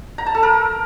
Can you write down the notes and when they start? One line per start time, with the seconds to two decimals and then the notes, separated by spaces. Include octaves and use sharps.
0.18 A#5
0.26 A5
0.35 A4
0.43 A#4